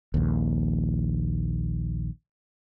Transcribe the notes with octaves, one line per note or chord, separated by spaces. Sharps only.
A#1 D#2